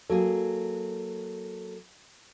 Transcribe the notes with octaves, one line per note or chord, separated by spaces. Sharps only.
F#3 A#3 G#4 A4